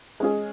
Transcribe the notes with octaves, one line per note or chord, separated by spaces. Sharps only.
G#3 C#4 G#4